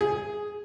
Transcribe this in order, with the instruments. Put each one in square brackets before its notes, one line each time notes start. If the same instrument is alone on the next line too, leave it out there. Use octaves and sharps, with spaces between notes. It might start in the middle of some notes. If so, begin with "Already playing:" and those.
[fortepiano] G#4